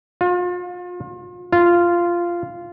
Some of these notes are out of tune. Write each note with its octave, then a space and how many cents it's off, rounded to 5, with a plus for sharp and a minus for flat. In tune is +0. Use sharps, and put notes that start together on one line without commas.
F4 +35
F4 -10